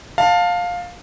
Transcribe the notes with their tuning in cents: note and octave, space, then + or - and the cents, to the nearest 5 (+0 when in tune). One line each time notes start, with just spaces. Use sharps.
F5 +15 A5 +15